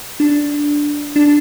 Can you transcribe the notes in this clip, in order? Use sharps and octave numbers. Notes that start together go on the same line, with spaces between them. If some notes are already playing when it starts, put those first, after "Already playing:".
D4
D4